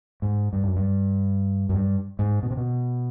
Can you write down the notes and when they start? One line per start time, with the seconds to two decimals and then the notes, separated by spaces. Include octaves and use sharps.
0.22 G#2
0.53 G2
0.64 F#2
0.76 G2
1.69 F#2
1.75 G2
2.19 G#2
2.43 B2
2.51 C3
2.57 B2